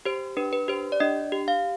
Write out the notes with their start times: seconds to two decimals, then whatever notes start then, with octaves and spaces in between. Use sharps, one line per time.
0.05 G4 C5
0.37 D4 B4
0.53 B4
0.68 G4 C5
0.92 D5
1.00 D4 D#5
1.32 G4
1.48 F5